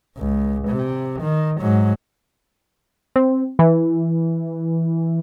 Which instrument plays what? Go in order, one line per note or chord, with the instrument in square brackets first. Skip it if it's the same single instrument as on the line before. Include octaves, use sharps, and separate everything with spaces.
[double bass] C#2
C3
D#3
G#2 F#3
[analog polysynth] C4
E3